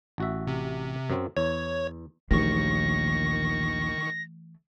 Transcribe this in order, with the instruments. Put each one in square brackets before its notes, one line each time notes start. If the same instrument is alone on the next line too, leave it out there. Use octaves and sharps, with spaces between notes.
[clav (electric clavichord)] A1 F#4 E5
[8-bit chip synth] C3
[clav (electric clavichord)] F#2 F#3 C4
[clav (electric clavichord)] E2 [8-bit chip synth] C#5
[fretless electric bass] A#1 D#2 [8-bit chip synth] D#3 C#6 [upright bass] E3 A3 [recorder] A#6